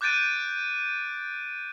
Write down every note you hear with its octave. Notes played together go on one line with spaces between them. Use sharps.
D6 F#6 G6 A6 D7 D#7